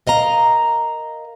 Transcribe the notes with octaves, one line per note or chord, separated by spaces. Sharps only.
A#4 D#5 F5 A#5